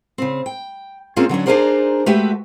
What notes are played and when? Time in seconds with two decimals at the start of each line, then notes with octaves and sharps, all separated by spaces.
0.18 C#3 C4
0.46 G5
1.16 A#3 C4 C#4 F4 G#4 C5
1.29 D3 F#3 C#4 D4
1.46 D4 D#4 G#4 A#4 C5 D5
2.06 G#3 A3 F#4 G4 B4 E5